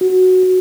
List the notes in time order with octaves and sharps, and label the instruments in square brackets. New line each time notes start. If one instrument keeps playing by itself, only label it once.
[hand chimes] F#4
F#4